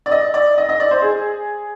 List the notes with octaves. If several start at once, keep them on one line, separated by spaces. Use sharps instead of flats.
D5
D#5
D5
D#5
D#5
D5
C5
G#4